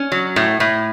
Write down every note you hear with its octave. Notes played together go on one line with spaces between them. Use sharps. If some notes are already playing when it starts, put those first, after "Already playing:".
Already playing: C#4
F#3
A2
A2